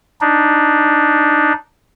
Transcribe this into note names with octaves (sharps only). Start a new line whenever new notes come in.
D4 D#4